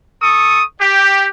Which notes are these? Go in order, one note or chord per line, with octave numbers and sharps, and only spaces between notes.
A4 C#6 D#6
G4